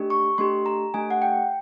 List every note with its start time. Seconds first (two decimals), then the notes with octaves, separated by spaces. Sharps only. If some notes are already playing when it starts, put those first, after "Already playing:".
Already playing: A3 D4 G4
0.10 C#6
0.38 A3 D4 G4 C6
0.66 A#5
0.94 A3 D4 G4 G#5
1.10 F#5
1.22 G5